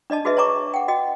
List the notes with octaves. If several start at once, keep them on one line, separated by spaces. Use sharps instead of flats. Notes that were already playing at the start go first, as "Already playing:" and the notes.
D4 D5 D#5 A5
F#4 G#4 B4 D#5 E5
C#5 D5 G#5 A#5 C#6 D6
F#5 G5
F#4 D#5 G5